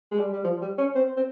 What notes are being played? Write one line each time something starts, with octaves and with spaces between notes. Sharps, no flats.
G#3
G3
G3
F3
G3
C#4
C4
C4